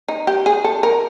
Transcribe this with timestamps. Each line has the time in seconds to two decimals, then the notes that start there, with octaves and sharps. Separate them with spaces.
0.08 D#4
0.27 G4
0.46 G#4
0.64 A4
0.83 A#4